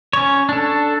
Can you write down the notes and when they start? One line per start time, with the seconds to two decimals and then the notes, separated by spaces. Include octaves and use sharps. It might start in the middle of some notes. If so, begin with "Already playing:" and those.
0.13 C#4 C#5
0.49 D4 A4